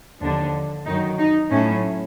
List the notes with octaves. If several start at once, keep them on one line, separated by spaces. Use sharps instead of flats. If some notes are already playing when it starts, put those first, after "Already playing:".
D#2 D3 F3 D4
F#2 D#3 F#3 D#4
D#4
A2 F#3 C#4